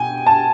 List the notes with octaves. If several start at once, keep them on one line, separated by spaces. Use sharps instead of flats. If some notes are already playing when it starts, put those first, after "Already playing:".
Already playing: B2 G5 G#5
A5